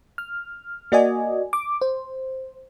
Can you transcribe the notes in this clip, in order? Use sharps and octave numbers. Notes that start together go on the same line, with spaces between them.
F6
A#3 F#4 D5 D#5 G#5
D6
C5